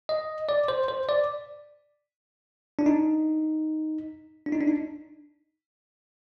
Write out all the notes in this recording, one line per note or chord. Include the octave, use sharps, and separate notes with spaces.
D#5
D5
C5
C5
D5
D4
D#4
D4
D#4
D4
D#4